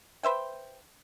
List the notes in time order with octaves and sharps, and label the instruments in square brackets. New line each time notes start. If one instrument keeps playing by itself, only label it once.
[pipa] B4 C5 E5 G5